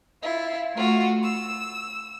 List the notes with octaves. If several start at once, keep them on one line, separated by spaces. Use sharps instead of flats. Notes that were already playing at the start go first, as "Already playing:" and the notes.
E4 F4
A3 F4 F#4
E6